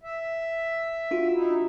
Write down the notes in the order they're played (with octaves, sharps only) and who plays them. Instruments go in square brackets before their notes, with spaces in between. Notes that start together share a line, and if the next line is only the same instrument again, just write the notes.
[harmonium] E5
[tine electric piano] D4 F4 F#4
[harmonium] D#4 E4